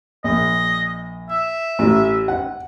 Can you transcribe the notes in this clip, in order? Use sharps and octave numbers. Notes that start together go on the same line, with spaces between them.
A#1 D#5
E5
A1
F#5